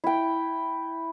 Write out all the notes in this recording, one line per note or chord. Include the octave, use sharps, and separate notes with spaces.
E4 G5